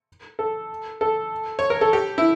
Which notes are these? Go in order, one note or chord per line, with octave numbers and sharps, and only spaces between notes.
A4
A4
C#5
A#4
A4
G4
E4